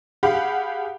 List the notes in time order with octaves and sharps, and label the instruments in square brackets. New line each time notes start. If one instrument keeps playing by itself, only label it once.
[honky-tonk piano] G4 G#4 F5 F#5 B5